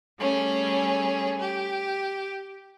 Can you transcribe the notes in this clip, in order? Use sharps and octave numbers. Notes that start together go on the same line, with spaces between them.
G3 A3 C#4 G#4
G4